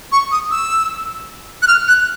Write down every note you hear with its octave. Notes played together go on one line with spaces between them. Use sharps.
C#6
D#6
E6
F#6
F6
F#6